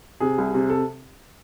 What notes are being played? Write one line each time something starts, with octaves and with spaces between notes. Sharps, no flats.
C3 G#4
C2
C3
A4